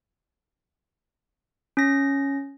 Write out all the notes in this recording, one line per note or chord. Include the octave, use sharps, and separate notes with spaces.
C#4 A#6